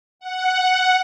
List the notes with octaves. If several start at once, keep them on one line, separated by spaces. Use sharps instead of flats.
F#5